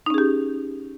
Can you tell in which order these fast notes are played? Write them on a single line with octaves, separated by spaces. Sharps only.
D#4 C#4 G#4 G4